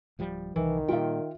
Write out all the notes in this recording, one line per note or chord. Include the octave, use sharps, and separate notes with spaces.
D1 F3 G3
C2 D#3 E3
A#2 G3 F4 E5 G5